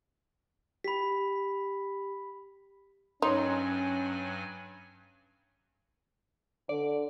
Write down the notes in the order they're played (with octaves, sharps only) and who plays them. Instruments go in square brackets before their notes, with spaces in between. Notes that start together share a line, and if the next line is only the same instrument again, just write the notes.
[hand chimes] G4 [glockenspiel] B5 B6
[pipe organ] G2 F#3 G#5 [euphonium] C#4 [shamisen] D#4 [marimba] C#5 C6
[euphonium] D3 [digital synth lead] D5